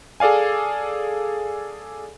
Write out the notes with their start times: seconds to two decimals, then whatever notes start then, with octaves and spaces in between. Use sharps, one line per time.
0.20 G#4 A4 D5 F5 G#5